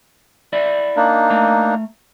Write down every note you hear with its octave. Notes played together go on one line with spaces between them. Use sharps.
E4 D5 E5
A#3 D4 D#4
A3 A#5